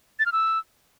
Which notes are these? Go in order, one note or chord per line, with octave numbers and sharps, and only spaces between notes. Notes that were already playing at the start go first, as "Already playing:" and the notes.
A6
F6
E6